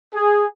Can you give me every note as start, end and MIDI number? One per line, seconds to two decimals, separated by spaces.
0.15 0.45 68